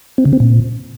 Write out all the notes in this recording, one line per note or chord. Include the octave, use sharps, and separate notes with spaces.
C4
C#3
C4
A#2